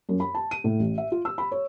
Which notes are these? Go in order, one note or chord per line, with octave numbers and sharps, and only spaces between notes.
F#2
B5
A5
D#7
A2
A1
E5
F4
E6
B5
C#5